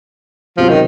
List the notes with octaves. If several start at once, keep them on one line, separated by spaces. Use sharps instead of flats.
C#2 C3 F3 F#3 C4
D#3